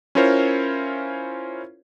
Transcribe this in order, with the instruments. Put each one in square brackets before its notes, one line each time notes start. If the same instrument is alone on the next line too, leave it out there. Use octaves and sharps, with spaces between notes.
[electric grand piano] C#4 E4 F4 A#4 C5 C#5